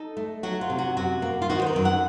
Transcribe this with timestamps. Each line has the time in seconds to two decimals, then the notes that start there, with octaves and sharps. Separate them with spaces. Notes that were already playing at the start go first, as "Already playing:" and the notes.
Already playing: D#4 A4
0.17 A3
0.43 F#3 F#4
0.61 F4
0.70 C3
0.78 F#4
0.97 F#2 F#4
1.22 A#3
1.42 F4
1.49 D#3 F#4
1.62 C5
1.67 A#4
1.76 F#2
1.85 F#5